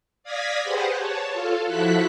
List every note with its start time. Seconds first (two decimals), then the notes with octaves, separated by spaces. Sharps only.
0.23 D5 F5 D#6 G#6 A#6 B6
0.62 G4 G#4 B4 C5 F#5
0.95 C#5 A5
1.33 F4 A4 F5
1.67 F3 E4 F#4 A4 F#6 B6